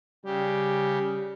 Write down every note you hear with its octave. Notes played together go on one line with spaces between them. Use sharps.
C#3 G3 G4